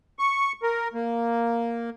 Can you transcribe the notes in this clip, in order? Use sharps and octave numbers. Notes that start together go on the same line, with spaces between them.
C#6
A#4
A#3